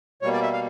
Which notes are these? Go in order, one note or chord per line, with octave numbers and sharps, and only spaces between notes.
B2 G3 A#3 C#5
D5
E5
F5